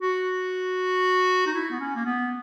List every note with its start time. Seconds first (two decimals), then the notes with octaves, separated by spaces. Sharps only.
0.01 F#4
1.47 D#4
1.54 E4
1.70 B3
1.79 C#4
1.96 A#3
2.05 B3